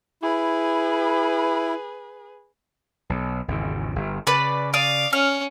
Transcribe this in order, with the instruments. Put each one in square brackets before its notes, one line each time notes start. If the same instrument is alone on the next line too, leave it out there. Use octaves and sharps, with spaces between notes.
[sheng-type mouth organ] E4 [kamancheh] G#4 B4
[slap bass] B1
G#1 E2 C#3
G1
[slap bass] C#3 [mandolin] B4 D5
[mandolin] D5 D#6 [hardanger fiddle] F5
[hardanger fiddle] C#4 [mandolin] F6